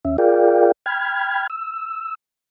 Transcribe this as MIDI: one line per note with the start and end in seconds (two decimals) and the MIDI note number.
0.05 0.17 39
0.05 0.17 61
0.05 0.17 76
0.18 0.72 65
0.18 0.72 68
0.18 0.72 70
0.18 0.72 74
0.18 0.72 77
0.18 0.72 79
0.86 1.47 79
0.86 1.47 83
0.86 1.47 89
0.86 1.47 92
1.50 2.15 88